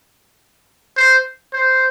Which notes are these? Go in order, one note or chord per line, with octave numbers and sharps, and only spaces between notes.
C5
C5